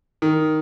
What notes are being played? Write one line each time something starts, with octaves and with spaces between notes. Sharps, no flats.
D#3